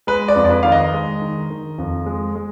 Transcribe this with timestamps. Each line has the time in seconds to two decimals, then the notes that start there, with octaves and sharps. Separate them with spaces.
0.07 G#3 B4
0.28 D5
0.36 F2
0.45 D5
0.50 B4
0.63 D#3 F5
0.72 D#5
0.93 G#3
1.22 D#3
1.50 D#3
1.78 F2
2.06 G#3
2.35 G#3